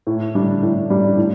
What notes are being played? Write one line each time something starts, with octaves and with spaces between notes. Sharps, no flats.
A2
G3 D4
A2
G3 D4
A2